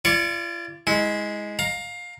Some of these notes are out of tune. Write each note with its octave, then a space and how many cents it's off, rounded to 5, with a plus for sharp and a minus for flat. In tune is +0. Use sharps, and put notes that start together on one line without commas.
F4 -40 D5 +0 C#6 +0
G#3 +0 E4 -30
F5 +20 A#5 +0